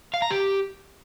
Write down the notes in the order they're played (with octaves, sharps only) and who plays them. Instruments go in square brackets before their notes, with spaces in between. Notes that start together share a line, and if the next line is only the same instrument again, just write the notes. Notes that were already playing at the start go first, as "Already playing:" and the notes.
[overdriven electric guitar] F5
A#5
G4